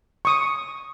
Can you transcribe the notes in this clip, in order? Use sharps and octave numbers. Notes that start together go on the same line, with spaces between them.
C#6 D#6